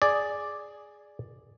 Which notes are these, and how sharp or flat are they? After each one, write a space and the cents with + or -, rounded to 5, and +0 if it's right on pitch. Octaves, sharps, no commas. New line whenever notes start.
G#4 +0 D5 +0